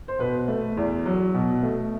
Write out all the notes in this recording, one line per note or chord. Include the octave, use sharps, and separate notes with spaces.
C5
B2 B4
A3
E2
F#3
B2
A3